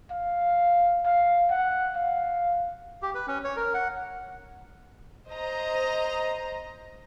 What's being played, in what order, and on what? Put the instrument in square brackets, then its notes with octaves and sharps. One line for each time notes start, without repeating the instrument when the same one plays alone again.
[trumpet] F5
F5
F#5
F5
[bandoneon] G4
B4
C#4
C#5
A#4
F#5
[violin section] C5 D#5 A#5